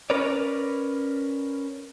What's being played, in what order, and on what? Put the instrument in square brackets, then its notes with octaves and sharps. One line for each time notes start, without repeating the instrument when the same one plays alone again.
[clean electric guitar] C#4 A#4 B4 C#5 D5